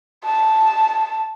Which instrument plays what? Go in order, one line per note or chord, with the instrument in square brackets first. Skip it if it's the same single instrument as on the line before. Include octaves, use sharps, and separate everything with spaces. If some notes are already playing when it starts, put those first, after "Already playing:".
[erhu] A5